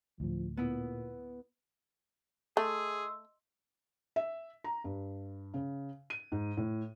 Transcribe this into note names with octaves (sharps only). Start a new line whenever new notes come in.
D2 A2 F3
A#2 B3 E4
A3 G#4 D#5 C6 E6
E5
A#5
G2
C#3
D#7
G#2
A2